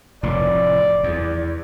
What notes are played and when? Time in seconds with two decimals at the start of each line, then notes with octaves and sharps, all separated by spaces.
0.23 F1 A2 D5
1.04 E2